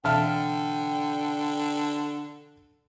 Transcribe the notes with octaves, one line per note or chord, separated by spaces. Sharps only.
B2 D3 E3 E5 F5 G5 A5 F6